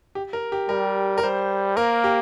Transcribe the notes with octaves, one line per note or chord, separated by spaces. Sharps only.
G4
A#4
G4
G3 A#4
A#4
G3 C5
A#3 A#4
G4